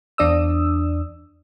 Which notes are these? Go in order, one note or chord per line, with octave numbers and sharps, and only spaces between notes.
E2 D4 D5 D#6 E6